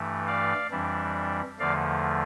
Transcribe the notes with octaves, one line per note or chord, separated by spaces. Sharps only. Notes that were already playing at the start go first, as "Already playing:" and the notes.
Already playing: G2 E3 A3
D5 F5
F2 E3 G3 D4
E2 D3 F3 A3 D5 F5